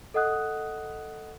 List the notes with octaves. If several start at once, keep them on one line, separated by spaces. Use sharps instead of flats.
A4 D#5 F#5 D#6 F#6